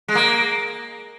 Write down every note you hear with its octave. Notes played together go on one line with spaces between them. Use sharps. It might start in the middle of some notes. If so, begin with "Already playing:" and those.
G#3
A#3